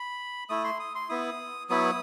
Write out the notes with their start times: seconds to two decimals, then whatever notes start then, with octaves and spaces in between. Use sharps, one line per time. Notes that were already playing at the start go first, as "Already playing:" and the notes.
Already playing: B5
0.49 A3 E4 D#6
0.64 C6
0.80 D#6
0.95 C6
1.09 B3 E4 D#6
1.69 F#3 B3 E4 D#6